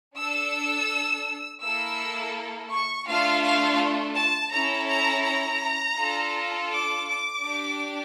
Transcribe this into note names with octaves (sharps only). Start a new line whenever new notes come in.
D4 A4 E6
A#3 E4 A4 E6
C#6
A3 D4 F4 A4 F5
F5
A5
C#4 E4 A4 A#5
A#5
A#5
D4 F4 A4
D6
D6
D4 G4